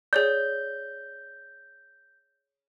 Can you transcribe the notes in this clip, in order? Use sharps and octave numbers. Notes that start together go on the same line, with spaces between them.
G#4 C#5 D5 G6